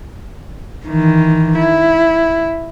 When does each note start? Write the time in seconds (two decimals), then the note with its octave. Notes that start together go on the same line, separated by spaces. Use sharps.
0.86 D#3 E3
1.59 E4